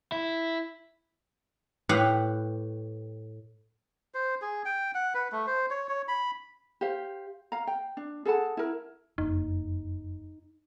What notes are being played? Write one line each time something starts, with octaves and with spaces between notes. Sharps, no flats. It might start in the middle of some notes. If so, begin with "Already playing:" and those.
E4
A2 G4 B4 F5 F#5 B5
C5
G#4
G5
F#5
B4
A3
C5
C#5
C#5
B5
G4 C5 F5
F5 A#5
G5
D4
G#4 A4 F#5 A5
E4 A#4
F#1 F2 A#3 D#4